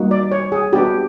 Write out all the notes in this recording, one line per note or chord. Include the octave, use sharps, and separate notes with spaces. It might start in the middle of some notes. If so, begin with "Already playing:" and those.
Already playing: G3 A#3 D#4 F#4
D5
C#5
G#4
B3 D4 F#4 G4